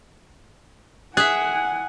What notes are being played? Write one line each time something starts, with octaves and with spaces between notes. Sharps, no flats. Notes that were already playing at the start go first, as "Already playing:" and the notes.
G#4 E5 F#5 G#5 F#6